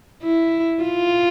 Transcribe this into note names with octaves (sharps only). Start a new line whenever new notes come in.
E4
F4